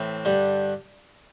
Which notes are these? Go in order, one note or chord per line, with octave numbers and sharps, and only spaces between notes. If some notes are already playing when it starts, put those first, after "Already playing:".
Already playing: A2 E3 C4
G2 D3 G3